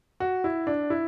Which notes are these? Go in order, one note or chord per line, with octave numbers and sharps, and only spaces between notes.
F#4
E4
D4
E4